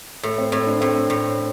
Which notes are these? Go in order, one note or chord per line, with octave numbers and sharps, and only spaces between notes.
A2 A3
C4
A2 C4
D4
A2 C4
A2